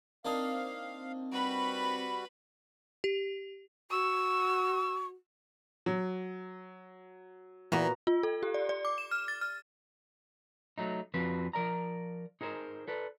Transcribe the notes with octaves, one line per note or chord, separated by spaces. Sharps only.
A#3 C4 D4 D#4 F5
G3 F#4 B4 B5
G4
F#4 C#6 E6
F#3
A#2 E3 A#3 B3 F#4 A#5
F4
A4
G4
D5
D5
D6
E7
F6
A6
F6
F#3 A3 D#4
F2 F3 C4 F#4 B4
F3 A#4 D5 A#5
D#4 G#4 A#4 C5
A4 B4 D5